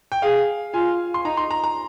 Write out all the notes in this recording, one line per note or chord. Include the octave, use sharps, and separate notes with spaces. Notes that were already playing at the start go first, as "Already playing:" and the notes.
G5
G#4 F5
F4 G#5
C6
D#4 A#5
C6
A#5
A#5